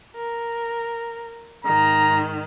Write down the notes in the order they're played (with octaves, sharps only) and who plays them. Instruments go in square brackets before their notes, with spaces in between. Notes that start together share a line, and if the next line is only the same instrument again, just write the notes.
[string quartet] A#4
[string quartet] G#2 D#3 [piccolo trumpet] A#5